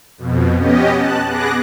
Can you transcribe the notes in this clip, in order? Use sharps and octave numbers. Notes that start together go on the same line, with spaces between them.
F2 B2
B3 C#4 G4 D#5
A5 F#6
B3 G#4 D6 F#6 A#6